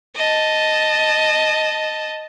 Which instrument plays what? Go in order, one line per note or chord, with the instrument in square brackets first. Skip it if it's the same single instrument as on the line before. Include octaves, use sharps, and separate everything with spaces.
[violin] D#5 A5